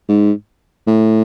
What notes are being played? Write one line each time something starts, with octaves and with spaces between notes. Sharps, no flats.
G#2
A2